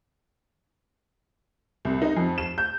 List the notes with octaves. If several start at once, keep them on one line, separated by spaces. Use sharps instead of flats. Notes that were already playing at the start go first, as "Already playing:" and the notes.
C2
D#4
F2
E7
G6